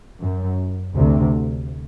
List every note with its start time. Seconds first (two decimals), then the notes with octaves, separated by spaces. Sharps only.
0.22 F#2
0.96 D2 C3